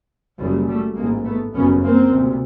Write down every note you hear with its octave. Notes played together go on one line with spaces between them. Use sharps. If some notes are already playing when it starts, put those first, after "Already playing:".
F#1 F#2 C#3 F3 G3
G3 A3
A1 G#2 G#3 A#3
A3 B3
G1 F#2 C#3 B3 C#4
A#3 C4
D2 C3